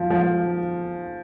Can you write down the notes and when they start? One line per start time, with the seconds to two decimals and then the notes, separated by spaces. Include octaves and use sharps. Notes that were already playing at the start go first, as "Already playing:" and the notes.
Already playing: F3
0.10 F3